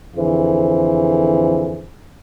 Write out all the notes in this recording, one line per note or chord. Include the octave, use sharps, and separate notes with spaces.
F2 D3 E3 G#4 C5